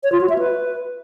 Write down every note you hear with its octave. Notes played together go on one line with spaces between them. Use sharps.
C#5
F4
F#4
E5
B4